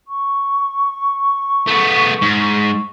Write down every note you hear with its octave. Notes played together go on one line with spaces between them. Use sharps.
C#6
A3 B3
G#2